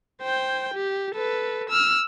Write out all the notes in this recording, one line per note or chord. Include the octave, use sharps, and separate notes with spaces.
C5 G5
G4
A4 B4
E6 F6